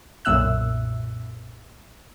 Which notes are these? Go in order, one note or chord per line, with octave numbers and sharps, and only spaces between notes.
B1 F#2 A#2 E5 E6 F#6